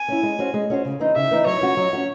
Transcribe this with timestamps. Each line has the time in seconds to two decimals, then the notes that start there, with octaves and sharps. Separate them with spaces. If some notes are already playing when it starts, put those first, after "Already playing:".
Already playing: G#5
0.08 C#4 E4
0.23 G#3
0.39 C#4 F#4 C5
0.54 G#3
0.70 C#4 F#4 C5
0.85 C#3
1.00 E3 C4 D#4
1.15 C#3 E5
1.31 E3 C4 D#4
1.46 F#3 C#5
1.61 C#4 F#4
1.77 F#3
1.93 C#4 F#4